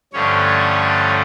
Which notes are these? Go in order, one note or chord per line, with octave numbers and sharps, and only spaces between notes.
G2 D3 F3 A3 C#4 C#5